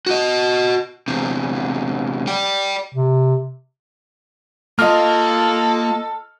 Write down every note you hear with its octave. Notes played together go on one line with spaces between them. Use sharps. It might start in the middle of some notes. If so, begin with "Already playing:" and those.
F#4 D#5
E2 C3
D5 G5
C3
A#3 F4 A4 D#5 F5 F6